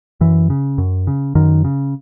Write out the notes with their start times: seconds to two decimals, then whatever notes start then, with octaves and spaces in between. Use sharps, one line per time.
0.21 F#2 E3
0.50 C#3
0.78 F#2
1.07 C#3
1.35 F#2 D#3
1.65 C#3